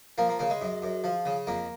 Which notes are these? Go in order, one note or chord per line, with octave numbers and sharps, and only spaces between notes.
F3 A#3
A#3
C#3 A#3
G#3
F#2
F#2
F3
C#3
F2 A#3